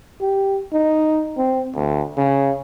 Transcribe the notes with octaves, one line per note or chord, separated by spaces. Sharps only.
G4
D#4
C4
D2
C#3